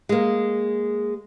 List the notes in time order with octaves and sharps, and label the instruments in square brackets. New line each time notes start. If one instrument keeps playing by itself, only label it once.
[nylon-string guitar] G#3 A#3